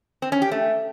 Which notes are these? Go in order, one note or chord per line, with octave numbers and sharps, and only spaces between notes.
C4
C#4
G4
A3